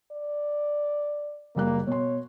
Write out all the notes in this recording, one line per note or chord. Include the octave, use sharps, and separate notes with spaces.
D5
F#1 G3 A#3 F#6
B2 C#5 C6